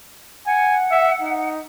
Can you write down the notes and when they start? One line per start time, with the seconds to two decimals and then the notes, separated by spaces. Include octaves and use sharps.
0.47 F#5 G#5
0.91 E5
1.22 D#4